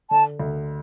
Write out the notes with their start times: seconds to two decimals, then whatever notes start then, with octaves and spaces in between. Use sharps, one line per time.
0.11 D3 A5
0.40 D2